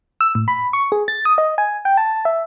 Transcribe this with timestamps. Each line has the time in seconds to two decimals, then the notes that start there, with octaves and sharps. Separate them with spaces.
0.21 E6
0.35 A2
0.48 B5
0.73 C#6
0.92 G#4
1.08 A6
1.25 D#6
1.38 D#5
1.58 G#5
1.85 G5
1.97 A5
2.25 E5